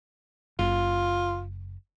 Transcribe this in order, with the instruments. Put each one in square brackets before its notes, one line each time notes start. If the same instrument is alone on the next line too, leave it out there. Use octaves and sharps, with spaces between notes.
[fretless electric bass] F#1 [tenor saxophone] F4